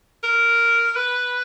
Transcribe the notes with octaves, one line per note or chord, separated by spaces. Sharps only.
A#4
B4